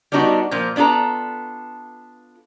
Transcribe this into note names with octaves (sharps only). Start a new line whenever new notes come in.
G3 B3 D4 D#4 F#4
A#2 F3 F4
B3 D4 F4 A4 A#5